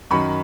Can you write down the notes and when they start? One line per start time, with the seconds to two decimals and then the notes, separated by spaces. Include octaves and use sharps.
0.11 F#2 D#3 F#3 B5 C#6